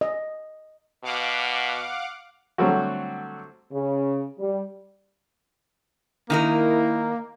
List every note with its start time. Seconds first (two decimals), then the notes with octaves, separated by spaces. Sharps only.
0.01 D#5
1.04 B2 F5 F#5 D6
2.58 D3 F#3 G3 A3 C4 F#4
3.72 C#3
4.39 G3
6.30 D#3 A#3 D#4 E4 A#4